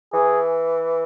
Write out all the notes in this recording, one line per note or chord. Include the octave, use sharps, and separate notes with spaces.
E3 G#4